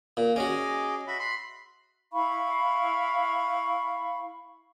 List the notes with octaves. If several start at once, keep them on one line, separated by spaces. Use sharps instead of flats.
A#2
C#4 F#4 G#4 D#5 D6
F#4 E5 B5
B5 C6
E4 F5 B5 C#6